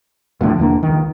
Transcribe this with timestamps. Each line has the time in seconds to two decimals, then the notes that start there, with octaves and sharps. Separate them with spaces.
0.41 E1 F2 A2 D3
0.58 F1 E2 A#3 D4
0.83 C#2 D#3